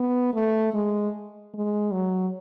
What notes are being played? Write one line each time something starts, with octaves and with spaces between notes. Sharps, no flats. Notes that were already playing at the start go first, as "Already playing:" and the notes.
Already playing: B3
A3
G#3
G#3
F#3